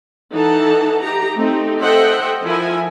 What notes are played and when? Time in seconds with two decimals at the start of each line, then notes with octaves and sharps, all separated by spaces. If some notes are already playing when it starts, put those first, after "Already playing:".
0.31 E3 D#4 A4 F#5 A5
1.02 D#4 G4 A#5
1.36 A3 C4 D#4 G4
1.81 A4 C5 D#5 E5 F#5 G5
2.45 F3 E4 A#4 G#5